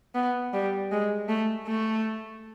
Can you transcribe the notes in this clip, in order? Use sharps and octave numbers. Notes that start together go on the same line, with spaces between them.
B3
G3
G#3
A3
A3